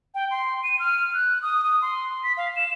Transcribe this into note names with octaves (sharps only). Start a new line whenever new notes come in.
G5
C6
D#7
F6
F#6
D#6
D#6
C6
B6
F5
E7